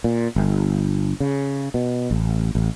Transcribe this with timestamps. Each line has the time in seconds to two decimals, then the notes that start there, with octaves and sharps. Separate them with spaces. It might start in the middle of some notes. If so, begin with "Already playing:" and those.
0.04 A#2
0.36 G1
1.20 C#3
1.74 B2
2.11 A1
2.55 A1